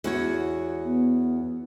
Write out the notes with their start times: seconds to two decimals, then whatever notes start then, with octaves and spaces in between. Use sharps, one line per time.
0.04 E2 F#4 C#5
0.85 B3